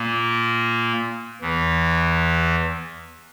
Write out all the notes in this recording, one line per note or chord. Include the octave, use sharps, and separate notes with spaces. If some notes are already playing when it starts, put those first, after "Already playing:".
Already playing: A#2 A#3
E2 E3